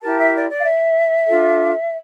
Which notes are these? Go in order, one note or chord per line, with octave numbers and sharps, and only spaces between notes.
E4 G4 A#4 A5
E5
D5
D5
F5
E5
D4 F4 A4